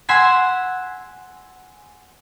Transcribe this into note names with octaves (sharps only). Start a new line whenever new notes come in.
F#5 G#5 C6 E6 G#6 B6